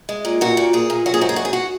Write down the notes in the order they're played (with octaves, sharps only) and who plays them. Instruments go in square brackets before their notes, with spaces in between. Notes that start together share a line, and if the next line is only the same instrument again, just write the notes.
[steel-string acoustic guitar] G#3
A#2
A#2 F#4
A#2
A#2 G#4
A#2
F#3 F#4
G#4
G#2 F#4
G#4
G#2 F#4
G#4
F#4